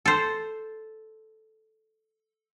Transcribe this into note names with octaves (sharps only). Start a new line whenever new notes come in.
A4 C5